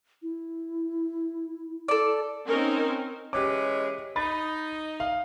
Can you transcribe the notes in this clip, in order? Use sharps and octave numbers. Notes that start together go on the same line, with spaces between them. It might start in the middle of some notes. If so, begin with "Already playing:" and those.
E4
A4 D5
C4 C#4 D#4 A#4
E3 G#3 C#4 G4 D6
D#4 B5 A6
F5